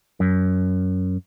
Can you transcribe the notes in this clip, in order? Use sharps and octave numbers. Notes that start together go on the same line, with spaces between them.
F#2